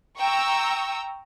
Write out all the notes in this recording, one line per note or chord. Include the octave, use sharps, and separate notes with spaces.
G5 A#5 C#6 E6